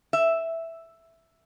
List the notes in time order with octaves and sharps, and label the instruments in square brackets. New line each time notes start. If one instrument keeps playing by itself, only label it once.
[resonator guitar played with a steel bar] E5